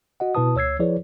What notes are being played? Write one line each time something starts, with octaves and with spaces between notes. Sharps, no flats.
F#4 D#5 F#5
B2 E4 B4 A5 D#6
D2 C#5 E6 G#6 C7
F3 E4 G#4 B4 C#5 D5